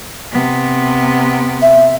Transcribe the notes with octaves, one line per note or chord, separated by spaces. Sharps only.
C3 B3
E5